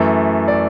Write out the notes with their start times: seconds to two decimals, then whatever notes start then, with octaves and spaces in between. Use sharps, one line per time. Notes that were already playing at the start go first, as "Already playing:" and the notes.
Already playing: F#2 E3 A3
0.48 D5